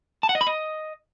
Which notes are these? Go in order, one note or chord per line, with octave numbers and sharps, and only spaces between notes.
A5
F#5
D#5
B5
D#5